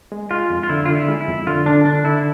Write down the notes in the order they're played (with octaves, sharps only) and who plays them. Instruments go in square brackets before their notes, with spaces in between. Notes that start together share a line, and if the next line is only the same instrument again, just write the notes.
[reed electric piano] G#3
[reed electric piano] G#3 [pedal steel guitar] F4
[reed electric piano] F2
[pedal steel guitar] F4
[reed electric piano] D3 [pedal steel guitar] E4
[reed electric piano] D3 [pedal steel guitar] F4
[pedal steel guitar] E4
[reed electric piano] G#3
[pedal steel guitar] E4
[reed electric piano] F2
[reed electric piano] D3 [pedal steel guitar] F4
[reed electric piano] D3 [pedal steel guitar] D4
[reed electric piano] D3 [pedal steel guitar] D4
[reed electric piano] D3 [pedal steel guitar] E4